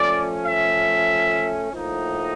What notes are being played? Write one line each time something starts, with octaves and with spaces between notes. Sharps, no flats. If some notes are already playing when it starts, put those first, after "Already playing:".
Already playing: F3 A3 C#4 D5
E5
A2 F3 A#3 D#4